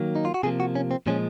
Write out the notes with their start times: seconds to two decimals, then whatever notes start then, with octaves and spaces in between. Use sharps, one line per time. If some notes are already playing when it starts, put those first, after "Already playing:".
Already playing: D#3 F#3 A#3
0.16 D#4
0.25 F4
0.34 F#4
0.43 C3 F3 A#3 G#4
0.60 F#4
0.75 C#4
0.91 C4
1.07 A#2 F3 G#3 C#4